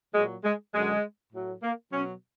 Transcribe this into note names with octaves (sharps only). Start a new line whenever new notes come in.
A#2 F#3 G#3
G#3
F#2 D3 F#3 G#3
A2 F#3
A#3
B2 F#3 C#4